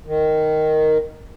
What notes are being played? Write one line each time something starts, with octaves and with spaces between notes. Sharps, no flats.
D#3